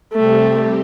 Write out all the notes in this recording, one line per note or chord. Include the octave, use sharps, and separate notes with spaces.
C3 G3 A3 C4 G4